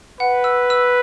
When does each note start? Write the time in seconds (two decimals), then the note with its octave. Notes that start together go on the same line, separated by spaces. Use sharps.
0.20 B4 F#5
0.44 E6
0.70 E6